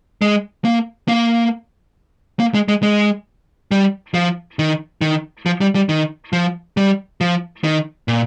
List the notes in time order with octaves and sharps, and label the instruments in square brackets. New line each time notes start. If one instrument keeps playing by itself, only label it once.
[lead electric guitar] G#3
A#3
A#3
A#3
G#3
G#3
G#3
G3
F3
D#3
D#3
F3
G3
G3
D#3
F3
G3
F3
D#3
A#2